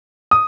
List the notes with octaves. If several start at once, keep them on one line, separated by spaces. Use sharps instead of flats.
D#6